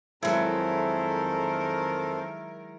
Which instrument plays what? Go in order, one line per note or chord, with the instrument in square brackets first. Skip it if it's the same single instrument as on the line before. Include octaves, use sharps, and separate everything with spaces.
[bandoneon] F2 A4 C5 [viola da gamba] D#3 A#4 [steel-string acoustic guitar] F#3 G#3 [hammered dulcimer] E4